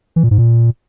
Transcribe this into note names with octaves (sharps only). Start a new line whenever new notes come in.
E3
A#2
G#2
A#2